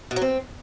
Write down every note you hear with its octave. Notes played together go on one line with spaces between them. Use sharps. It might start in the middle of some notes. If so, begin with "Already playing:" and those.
B2
F#3
C4